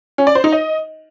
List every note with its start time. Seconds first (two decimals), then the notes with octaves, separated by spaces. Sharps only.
0.18 C#4
0.27 D5
0.35 C5
0.44 D#4
0.52 D#5